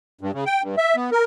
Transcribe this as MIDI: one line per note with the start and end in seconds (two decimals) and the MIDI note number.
0.21 0.31 43
0.34 0.44 49
0.46 0.62 79
0.63 0.76 43
0.77 0.96 76
0.96 1.10 59
1.12 1.25 70